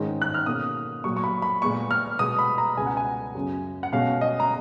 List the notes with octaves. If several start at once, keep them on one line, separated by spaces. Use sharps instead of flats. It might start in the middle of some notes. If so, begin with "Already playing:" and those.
Already playing: G#2 D#3 G#3 C#4
F#6
F6
B2 A#3 C#4 D#6
A#2 F#3 A#3 C#6
C#6
B5
B5
A#2 G#3 B3 C#6
F6
B2 G#3 B3 D#6
B5
A#5
C#2 B2 G#3 B3 G#5
F#5
G#5
F#2 C#3 F#3
F#5
B2 G#3 C#4 F5
D#5
A#5